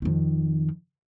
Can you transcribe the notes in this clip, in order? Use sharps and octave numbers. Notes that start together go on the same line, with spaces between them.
F2 D#3